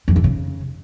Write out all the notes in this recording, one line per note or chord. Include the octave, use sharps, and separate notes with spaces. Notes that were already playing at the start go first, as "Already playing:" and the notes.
F2
G2
C#3